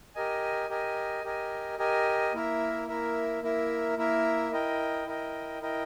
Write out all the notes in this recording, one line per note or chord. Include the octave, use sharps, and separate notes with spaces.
G4 A#4 D#5 G#5
G4 A#4 D#5 G#5
G4 A#4 D#5 G#5
G4 A#4 D#5 G#5
A#3 E4 A#4 E5
A#3 E4 A#4 E5
A#3 E4 A#4 E5
A#3 E4 A#4 E5
E4 A#4 D#5 G5
E4 A#4 D#5 G5
E4 A#4 D#5 G5